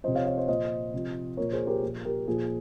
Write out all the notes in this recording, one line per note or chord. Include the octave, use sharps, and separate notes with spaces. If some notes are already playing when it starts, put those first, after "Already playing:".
C3 F3 C5 D#5
C#5 F5
C#5 F5
C5 D#5
A#2 F3 C5 D#5
C3 F3
A#2 F3 A#4 C#5
G#4 C5
G4 A#4
A#2 F3
G4 A#4
A#2 F3 G#4